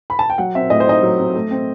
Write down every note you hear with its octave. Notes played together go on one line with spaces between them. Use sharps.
B5
A5
G5
F#3 F#5
C4 E5
A2 D#5
C5
D#4 D#5
F#3
C4
A3
C4